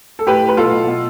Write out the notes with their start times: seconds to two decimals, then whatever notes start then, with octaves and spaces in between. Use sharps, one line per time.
0.19 A4
0.26 A2 G4 B4
0.43 A2
0.49 B4
0.57 B2 F4 A4
0.72 B2
0.87 B2